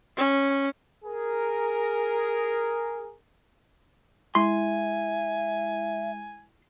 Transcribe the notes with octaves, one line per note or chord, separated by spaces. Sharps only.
C#4
G#4 A#4
G#3 E4 E5 G#5 C6